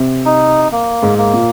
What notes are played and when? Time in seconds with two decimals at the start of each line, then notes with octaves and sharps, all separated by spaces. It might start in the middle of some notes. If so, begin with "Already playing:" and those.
Already playing: C3
0.25 D#4
0.72 A#3
1.03 G#2
1.18 A#3
1.33 A#2